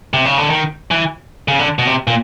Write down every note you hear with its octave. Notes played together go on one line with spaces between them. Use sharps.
C3
C#3
D3
D#3
E3
C#3
D3
B2
C3
A#2